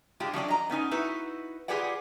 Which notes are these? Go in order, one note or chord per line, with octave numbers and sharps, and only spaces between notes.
G#3 D4 F4 G4
F3 F#3 D4 D5
D#5 A#5
B3 C#4 D#4 G#5
D#4 E4 F#4 B4
F4 G4 G#4 B4 D5 F#5